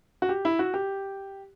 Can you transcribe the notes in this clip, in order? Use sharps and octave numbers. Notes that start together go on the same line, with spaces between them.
F#4
G4
E4
F#4
G4